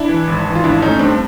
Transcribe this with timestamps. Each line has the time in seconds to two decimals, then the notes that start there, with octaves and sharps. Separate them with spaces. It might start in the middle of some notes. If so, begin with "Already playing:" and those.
Already playing: D4 E4
0.09 E3
0.27 G#1
0.45 E3
0.55 F4
0.64 G#1 D4 E4
0.82 A3 C#4 D#4
0.99 G2 C4 D4